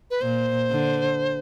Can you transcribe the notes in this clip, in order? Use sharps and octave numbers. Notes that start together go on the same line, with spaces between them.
B4
A#2 C5
D3